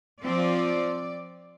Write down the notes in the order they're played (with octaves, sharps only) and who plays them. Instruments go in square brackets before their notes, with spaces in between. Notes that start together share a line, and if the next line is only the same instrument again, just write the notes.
[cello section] F3 C4 F4 D5